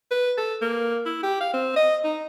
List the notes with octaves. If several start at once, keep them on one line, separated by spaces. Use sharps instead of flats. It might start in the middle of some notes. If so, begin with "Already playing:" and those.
B4
A4
A#3
E4
G4
F5
C4
D#5
D#4